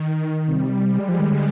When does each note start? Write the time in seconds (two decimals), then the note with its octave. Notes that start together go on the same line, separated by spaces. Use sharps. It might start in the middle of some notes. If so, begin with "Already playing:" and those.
Already playing: D#3
0.47 C3 G3
0.88 G#3
0.99 G3
1.09 F3
1.19 D#3
1.30 D3